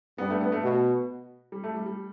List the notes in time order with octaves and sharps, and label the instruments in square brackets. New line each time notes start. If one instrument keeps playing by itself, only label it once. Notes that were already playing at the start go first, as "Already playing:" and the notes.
[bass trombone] G2 [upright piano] B3
[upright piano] A3
B3
A3
[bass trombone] B2
[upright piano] G3
A3
G3
G3